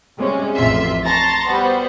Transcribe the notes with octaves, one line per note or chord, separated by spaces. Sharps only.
C3 G3 G#3 C#4
A1 F2 C3 F4 E5 C6
A5 A#5 C6 C#6 A6 A#6
G3 B3 F#4 C5